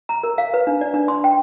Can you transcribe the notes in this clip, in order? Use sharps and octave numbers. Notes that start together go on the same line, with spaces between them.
A#5
A#4
F5
B4
D4
D5
D4
C6
G5